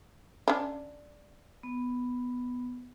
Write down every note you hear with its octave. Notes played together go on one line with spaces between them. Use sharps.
C#4 D4
B3